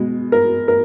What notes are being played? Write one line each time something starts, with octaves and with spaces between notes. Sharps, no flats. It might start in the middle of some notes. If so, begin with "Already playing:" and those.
Already playing: B2 G#3
A#4
A#4